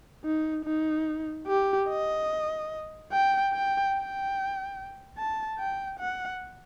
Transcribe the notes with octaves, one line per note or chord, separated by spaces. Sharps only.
D#4
D#4
G4
D#5
G5
G5
G5
A5
G5
F#5